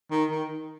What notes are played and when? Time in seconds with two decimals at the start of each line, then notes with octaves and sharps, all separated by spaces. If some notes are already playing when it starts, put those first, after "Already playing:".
0.11 D#3
0.30 D#3